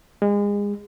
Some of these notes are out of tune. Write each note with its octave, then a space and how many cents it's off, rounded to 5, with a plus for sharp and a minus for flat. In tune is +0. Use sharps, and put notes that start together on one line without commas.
G#3 -30